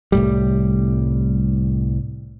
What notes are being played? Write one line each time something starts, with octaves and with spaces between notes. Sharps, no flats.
C2 A2 G3